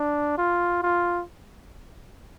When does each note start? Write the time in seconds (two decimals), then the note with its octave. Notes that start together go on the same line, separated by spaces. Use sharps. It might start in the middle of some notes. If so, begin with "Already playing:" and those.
Already playing: D4
0.38 F4
0.83 F4